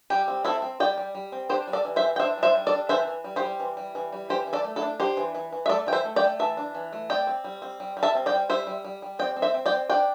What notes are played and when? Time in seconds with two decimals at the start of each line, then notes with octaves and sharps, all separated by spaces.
0.10 G3 G4
0.28 C4
0.45 C4 E4 A4
0.62 C4
0.80 G3 D5 G5
0.97 G3
1.15 G3
1.32 C4
1.49 D4 G4 C5
1.67 G3
1.73 A4 D5
1.85 E3
1.96 C5 E5
2.02 E3
2.16 G5
2.20 D4 C5 E5
2.37 G3
2.43 C5 E5
2.55 G3
2.67 A4 D5
2.72 D4
2.89 E3 C5 E5
3.07 E3
3.24 G3
3.36 G4 C5
3.42 G3
3.60 E3
3.77 G3
3.95 E3
4.12 G3
4.29 E3 G4 C5
4.47 E3
4.53 A4 D5
4.64 A3
4.76 E4 A4
4.82 D4
5.00 D4 G4 C5
5.17 E3
5.35 E3
5.52 E3
5.66 E5
5.69 A3 A4 D5
5.87 E3 G5
5.93 C5 E5
6.04 A3
6.16 D5 G5
6.22 A3
6.39 E3 E5 A5
6.57 D4
6.75 E3
6.93 A3
7.10 C4 D5 G5
7.27 C4
7.44 G3
7.62 C4
7.80 G3
7.97 G3
8.03 E5 A5
8.15 C4
8.26 D5 G5
8.32 G3
8.49 G3 C5 E5
8.67 G3
8.84 G3
9.02 G3
9.19 C4 D5 G5
9.36 C4
9.42 C5 E5
9.54 C4
9.66 D5 G5
9.72 C4
9.89 D4 D5 G5